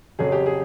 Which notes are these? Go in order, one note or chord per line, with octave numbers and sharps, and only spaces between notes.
F2 C#3 F#3 G#4
G4
G#4